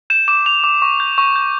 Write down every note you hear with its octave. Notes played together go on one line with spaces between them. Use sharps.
G6 E7
D6 E7
D6 F7
D6
C#6
G6
C#6
G6